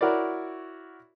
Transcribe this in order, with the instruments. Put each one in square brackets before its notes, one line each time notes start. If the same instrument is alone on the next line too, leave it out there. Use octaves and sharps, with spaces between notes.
[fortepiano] E4 F#4 A#4 C#5 D5